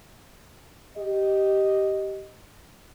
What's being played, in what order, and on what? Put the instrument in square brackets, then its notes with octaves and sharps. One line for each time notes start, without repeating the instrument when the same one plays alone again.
[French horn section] G4 D#5